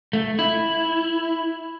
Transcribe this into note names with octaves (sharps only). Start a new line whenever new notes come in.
A3
E4